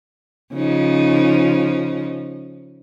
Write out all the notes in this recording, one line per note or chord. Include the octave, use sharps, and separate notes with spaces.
C#3 F3 D#4